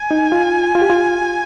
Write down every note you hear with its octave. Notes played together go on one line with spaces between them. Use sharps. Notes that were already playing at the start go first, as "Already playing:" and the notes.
Already playing: G#5
D#4
F4
F4
G4
F4